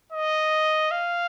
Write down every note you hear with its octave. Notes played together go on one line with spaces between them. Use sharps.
D#5
F5